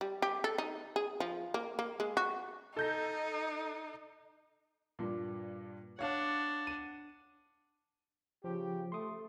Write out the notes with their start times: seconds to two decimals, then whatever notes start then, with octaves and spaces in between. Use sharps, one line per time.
0.01 G3
0.22 G4
0.44 A4
0.58 D#4
0.96 G#4
1.20 F3
1.54 A#3
1.79 A#3
2.00 G#3
2.17 F#4
2.77 D#4 A4 G6 A#6
4.99 G2 A#2
5.99 D4 C#5 F5 F#5
6.67 D#7
8.44 C#3 F3 G4
8.92 A3 C6 D#6